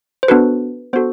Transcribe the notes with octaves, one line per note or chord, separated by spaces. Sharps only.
C5
B3 D4 F#4 A4 B4
B3 D4 F#4 A4 C5